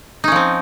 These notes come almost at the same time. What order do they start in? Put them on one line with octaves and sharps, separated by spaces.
D#4 C#4 F3 C4